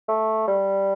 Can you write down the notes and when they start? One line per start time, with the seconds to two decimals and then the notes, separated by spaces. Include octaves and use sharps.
0.09 A3
0.48 G3